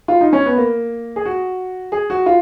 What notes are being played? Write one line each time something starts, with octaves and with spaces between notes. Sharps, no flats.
F4
D#4
C#4
B3
A#3
G#4
F#4
G#4
F#4
F4